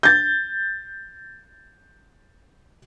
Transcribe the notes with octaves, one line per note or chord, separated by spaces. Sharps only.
G6 A6